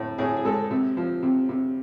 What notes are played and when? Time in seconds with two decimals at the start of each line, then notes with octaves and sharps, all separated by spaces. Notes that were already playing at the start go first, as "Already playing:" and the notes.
Already playing: A2
0.18 A2 G#4
0.37 G#4
0.45 G#3 A4
0.71 C3
0.97 F3
1.23 C3
1.49 C3